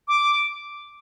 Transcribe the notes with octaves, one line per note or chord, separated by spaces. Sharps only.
D6